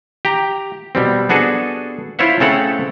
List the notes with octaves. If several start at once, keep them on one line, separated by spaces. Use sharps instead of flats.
G4 A#5
B2 G3 C4
B3 D4 F#4 G#4 A4
E4 F4 C5 C#5 E5 F#5
C#3 A3 C4 A4 C#5 F#5